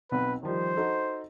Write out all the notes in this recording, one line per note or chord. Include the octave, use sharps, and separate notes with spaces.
B1 B3 C4 B4
D#3 F3 G3 C5
D#4 F#4 A4